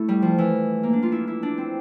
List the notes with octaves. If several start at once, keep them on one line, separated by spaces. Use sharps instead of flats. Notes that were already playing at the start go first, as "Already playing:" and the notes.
Already playing: A3 E4
G3
F3
E3
A#3
D4
F4
E4
E4
D4
C4